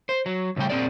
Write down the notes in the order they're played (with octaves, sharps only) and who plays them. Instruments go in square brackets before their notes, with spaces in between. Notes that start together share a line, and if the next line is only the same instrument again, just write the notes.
[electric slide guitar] C5
F#3
E2 A2 C#3 G3 G5
A#2 C4 G#4 D5